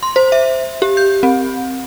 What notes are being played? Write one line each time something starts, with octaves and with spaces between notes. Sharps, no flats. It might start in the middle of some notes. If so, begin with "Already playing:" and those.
C6
C5
E5
G4
G6
C4